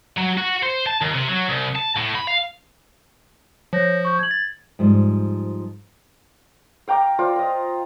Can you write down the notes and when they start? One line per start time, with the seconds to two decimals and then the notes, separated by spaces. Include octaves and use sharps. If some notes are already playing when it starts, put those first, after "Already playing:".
0.17 F#3
0.38 F#4
0.63 C5
0.87 A5
1.01 D#2
1.14 C3
1.28 F#3
1.49 C2
1.75 A5
1.97 A2
2.15 B5
2.27 F5
3.73 F3 C#5 G6 A#6
4.05 C#6 G6
4.19 G#6 F#7
4.31 A6
4.79 G#2 F3 G3
6.88 F5 G5 A#5 D6
7.19 F4 C5 D5
7.36 D#5 F5